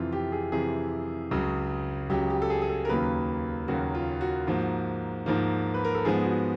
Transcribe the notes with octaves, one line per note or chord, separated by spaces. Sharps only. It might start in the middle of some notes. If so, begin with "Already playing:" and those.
Already playing: F2 C3 E3 F4
G4
G#4
F2 C3 E3 G#4
C#2 C#3 F#3
C#2 C#3 F#3 G4
G4
A4
G#4
G#4
A4
A#4
D#2 C#3 F#3 A#3 B4
D#2 C#3 F#3 A#3 F#4
F4
F#4
G#2 F3 A#3
G#2 F3 A#3
B4
A#4
A4
G#2 F3 G#3 B3 G#4
F#4